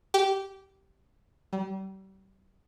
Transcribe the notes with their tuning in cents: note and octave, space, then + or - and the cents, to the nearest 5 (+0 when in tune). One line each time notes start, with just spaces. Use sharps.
G4 -15
G3 -35